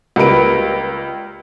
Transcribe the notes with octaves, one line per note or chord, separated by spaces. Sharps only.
C#2 G3 A#3 B4 D7